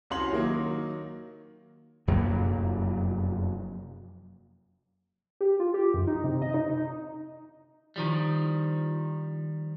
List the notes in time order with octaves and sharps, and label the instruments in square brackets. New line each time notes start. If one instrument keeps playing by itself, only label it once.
[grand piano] C2 C#4 F#4 C#5 C6 F#7
D#3 F#3 A#3
[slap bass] F1 F#2 F#3 A#3
[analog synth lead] G4
F4
G4
F#2
D#4
C3
D#5
D#4
D#4
[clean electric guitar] D#3 F3 G3